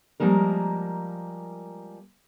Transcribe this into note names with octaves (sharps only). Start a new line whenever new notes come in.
F3 G3 G#3 A#3 A#4